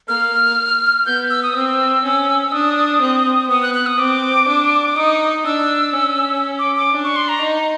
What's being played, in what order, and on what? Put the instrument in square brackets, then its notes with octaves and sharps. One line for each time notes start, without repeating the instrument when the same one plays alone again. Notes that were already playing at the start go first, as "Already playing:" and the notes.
[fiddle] A#3 [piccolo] F6
[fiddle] B3 [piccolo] G6
[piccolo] E6
D#6
[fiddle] C4 [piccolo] E6
[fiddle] C#4
[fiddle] D4 [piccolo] D#6
[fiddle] C4
[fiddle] B3 [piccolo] D#6
[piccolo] F#6
F#6
D#6
[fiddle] C4 [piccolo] D6
[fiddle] D4
[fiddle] D#4 [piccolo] D#6
[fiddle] D4 [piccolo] E6
[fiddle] C#4
[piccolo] D6
D6
[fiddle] D4
[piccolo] C#6
C6
A#5
[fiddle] D#4
[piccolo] A#5